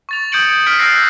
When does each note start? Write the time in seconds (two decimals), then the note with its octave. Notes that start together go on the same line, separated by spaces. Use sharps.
0.09 C#6 A6 F7
0.32 D#6 G6 G#6 C#7 D7 F#7
0.66 F6 G6 G#6 B6 C#7 D7
0.79 E6 F#6 G6 A6 A#6 C7